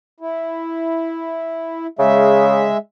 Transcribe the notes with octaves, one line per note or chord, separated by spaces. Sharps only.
E4
C#3 G#3 E5